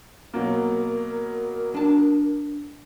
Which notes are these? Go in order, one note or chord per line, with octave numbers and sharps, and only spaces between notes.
B2 F#3 A#3 A#4
D4 A5